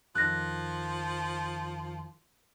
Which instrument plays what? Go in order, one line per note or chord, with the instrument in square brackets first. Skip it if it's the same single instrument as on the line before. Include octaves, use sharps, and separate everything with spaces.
[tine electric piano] F2 D#3 [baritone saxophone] F3 [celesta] F#6 A#6